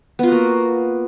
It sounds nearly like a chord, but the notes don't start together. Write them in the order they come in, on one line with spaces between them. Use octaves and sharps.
B3 F4 F#4 A#3